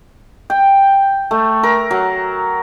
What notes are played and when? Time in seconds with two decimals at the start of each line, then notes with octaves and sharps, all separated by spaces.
0.50 G5
1.31 A3
1.63 A#4
1.91 F#3